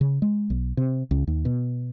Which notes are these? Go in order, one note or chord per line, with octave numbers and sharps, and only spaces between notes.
C#3
G#3
B1
C3
C#2
D#2
B2